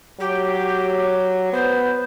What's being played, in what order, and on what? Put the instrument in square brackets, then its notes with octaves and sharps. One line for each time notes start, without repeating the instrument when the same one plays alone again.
[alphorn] F#3 [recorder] G4
[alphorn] B3 [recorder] C5